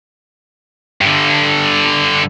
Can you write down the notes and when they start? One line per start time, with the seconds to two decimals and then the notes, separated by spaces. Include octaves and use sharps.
1.01 G2 D3